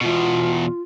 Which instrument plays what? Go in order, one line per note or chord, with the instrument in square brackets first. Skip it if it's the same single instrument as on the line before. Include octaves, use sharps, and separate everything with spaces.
[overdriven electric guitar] E2 B2 [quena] F4